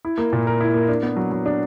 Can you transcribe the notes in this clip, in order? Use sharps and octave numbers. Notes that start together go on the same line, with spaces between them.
E4
A#3
A#2
A#4
E4
A#3
D4
B3
F#3
F#3
D4